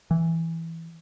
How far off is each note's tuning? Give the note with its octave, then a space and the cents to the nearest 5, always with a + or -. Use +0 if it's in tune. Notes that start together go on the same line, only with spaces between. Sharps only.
E3 -5